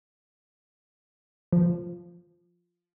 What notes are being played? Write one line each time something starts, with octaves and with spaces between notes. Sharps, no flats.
F3